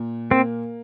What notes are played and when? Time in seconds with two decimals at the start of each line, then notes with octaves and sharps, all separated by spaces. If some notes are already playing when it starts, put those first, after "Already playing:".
Already playing: A#2
0.31 A#3 C4